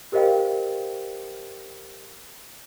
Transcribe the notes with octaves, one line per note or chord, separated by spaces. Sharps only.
G4 A#4 C5 D#5 F5 G5